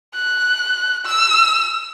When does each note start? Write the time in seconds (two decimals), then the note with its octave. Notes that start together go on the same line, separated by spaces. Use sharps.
0.15 F#6
1.05 E6